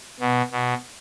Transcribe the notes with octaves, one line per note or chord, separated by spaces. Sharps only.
B2
B2